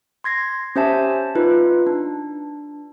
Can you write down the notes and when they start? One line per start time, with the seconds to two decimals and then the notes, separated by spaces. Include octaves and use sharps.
0.24 C6 G#6 A#6 C7
0.76 C#4 G4 C5 E5 G#5 A5
1.35 D#4 F4 B4
1.87 D4